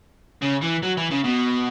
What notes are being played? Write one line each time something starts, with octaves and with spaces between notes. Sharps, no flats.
C#3
E3
F#3
E3
C#3
B2